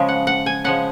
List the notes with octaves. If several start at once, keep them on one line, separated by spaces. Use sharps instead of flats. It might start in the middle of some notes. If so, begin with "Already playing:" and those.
Already playing: C#3 F3 G#3
F#5
F#5
G#5
C#3 F3 G#3 F#5